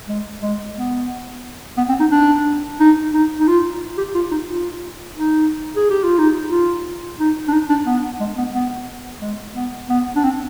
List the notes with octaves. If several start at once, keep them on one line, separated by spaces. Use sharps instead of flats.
G#3
G#3
B3
B3
C4
D#4
D4
D#4
D#4
D#4
F4
G4
F4
D#4
F4
D#4
G#4
G4
F4
D#4
F4
D#4
D4
D#4
D4
B3
G#3
B3
B3
G#3
B3
B3
D4
C4